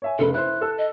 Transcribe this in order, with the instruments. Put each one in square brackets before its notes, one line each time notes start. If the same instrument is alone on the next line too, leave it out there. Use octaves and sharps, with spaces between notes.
[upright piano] C#5 E5 G#5
[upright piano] F1 C#3 B4 [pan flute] A4
[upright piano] E4 C5 [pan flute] F#6
[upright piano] A4 E6
[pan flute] D#5